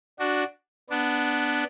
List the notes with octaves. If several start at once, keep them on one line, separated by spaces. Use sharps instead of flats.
D4 F#4
B3 D4